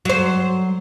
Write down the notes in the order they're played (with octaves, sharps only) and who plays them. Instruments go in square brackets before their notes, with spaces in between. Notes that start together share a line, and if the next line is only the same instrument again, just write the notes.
[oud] F#3 C5